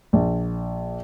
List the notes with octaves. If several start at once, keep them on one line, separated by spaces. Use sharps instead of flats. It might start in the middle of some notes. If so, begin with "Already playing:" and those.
A#1